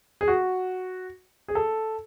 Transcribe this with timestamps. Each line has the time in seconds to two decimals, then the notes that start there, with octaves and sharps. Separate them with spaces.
0.21 G#4
0.28 F#4
1.48 G#4
1.55 A4